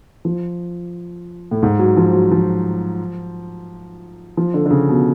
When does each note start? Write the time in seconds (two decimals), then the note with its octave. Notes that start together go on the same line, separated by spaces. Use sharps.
0.25 F3
1.51 A2
1.63 G#2
1.79 F#3
1.97 F3
2.13 F#3
2.31 F3
4.37 F3
4.54 D3
4.66 D3
4.71 C#3
4.89 B2